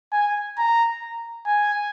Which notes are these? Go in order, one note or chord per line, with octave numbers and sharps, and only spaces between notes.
G#5
A#5
G#5